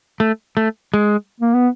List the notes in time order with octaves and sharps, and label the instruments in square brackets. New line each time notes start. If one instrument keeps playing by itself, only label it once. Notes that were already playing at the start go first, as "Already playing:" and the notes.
[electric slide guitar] A3
A3
G#3
[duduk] A#3
B3